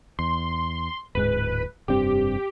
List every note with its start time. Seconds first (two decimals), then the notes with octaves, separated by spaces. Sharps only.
0.19 E2 C6
1.15 D1 G#2 G#3 B4
1.88 F1 G2 C4 G4